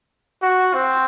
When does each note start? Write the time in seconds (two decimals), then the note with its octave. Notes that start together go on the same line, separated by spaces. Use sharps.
0.42 F#4
0.74 C4